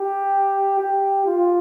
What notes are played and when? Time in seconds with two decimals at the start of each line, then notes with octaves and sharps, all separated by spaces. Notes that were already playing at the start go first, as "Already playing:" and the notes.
Already playing: G4
0.79 G4
1.26 F4